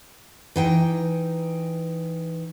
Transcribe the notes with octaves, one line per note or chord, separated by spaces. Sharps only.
E3 D#4 G5